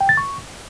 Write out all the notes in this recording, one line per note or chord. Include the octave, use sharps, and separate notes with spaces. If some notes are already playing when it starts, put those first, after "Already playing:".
G5
A6
C#6